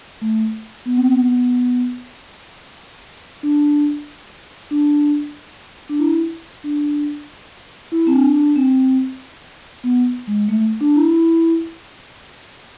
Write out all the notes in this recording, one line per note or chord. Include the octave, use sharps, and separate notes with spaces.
A3
B3
C4
B3
D4
D4
D4
E4
D4
E4
C4
D4
D4
C4
B3
G#3
A3
D4
E4
E4